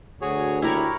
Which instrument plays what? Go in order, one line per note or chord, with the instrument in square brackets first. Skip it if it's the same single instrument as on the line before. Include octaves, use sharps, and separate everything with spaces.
[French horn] D2 [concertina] F#4 G#4 C#5
[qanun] E4 A#4 C#5 [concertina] G4